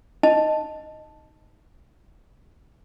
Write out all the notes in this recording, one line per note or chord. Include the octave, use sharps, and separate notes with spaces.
D#4 D#5 A5